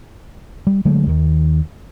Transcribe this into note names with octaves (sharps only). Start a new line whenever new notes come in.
G3
D3 F#3 G#3 A3
D#2 D#3